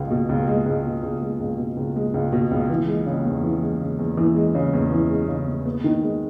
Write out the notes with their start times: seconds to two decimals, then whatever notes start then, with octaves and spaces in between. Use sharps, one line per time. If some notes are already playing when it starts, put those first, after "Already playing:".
Already playing: C#2 G#3
0.10 B2
0.29 C#2
0.47 G#3
0.66 C#2
0.85 B2
1.03 C#2
1.21 G#3
1.40 C#2
1.58 B2
1.77 C#2
1.96 G#3
2.14 C#2
2.32 B2
2.51 C#2
2.70 E3
2.87 G#3
3.06 C#3
3.25 E2
3.44 E3
3.62 G#3
3.81 C#3
3.99 E2
4.17 E3
4.36 G#3
4.55 C#3
4.73 E2
4.92 E3
5.09 G#3
5.28 C#3
5.47 E2
5.66 B3
5.84 D#3
6.03 G#3